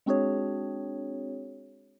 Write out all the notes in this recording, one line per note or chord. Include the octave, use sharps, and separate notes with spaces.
G#3 C4 D4 F#4 G#4 C#5